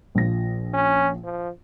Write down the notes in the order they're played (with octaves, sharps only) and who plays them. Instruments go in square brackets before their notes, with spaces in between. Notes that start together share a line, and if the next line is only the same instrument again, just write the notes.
[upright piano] A#1 F3 A#6
[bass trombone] C#4
F3